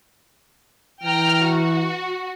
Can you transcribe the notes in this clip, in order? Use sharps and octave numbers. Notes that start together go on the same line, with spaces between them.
E3 G5 A#5 F6
F#4